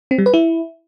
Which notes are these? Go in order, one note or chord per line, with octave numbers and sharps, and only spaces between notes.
C4
G3
B4
E4